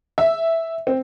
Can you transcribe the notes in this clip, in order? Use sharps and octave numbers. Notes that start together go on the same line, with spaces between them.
E5
C4